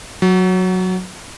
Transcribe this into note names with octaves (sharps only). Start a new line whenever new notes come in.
F#3